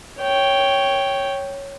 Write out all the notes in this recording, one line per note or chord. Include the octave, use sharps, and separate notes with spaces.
C#5 G5